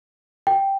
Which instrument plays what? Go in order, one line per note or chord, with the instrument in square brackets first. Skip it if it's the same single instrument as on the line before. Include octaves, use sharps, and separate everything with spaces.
[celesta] G5